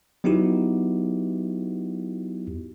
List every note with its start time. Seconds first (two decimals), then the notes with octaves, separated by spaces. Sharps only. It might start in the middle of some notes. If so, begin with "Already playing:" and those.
0.24 F#3 B3 D#4 E4 F#4 G4